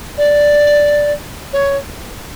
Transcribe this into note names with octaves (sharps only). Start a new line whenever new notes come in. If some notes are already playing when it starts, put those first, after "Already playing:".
D5
C#5